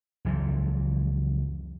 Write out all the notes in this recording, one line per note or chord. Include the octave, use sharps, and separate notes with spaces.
C#2 F#2 E3 F3